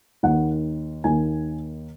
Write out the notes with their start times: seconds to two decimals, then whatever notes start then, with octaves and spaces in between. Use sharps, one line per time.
0.23 D#2 D#3 A#3 F#5
1.04 D#2 D#3 A#3 G#5